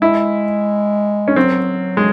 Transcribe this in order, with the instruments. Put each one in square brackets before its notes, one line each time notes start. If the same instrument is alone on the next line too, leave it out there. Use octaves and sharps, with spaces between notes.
[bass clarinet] G#3 [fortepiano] E4
[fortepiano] C#4
[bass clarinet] F#3 [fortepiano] C4
[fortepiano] G#3